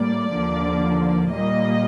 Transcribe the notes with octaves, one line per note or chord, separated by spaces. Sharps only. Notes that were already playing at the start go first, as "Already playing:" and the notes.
Already playing: A2 G3 A#3 D5
D#2 D3 F3 A#3
A#2 G3 A#3 D#5